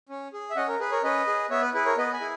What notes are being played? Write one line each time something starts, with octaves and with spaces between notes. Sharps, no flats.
C#4
G#4
E5
C#4 D#5 F#5
A#4
G#4 B4
A#4 C#5
C#4 B4 D#5
G#4
B3 C#5 E5
B4
E4 G#4 B4
A#4 C#5
B3 B4 D#5
G#5 B5
E4 G#4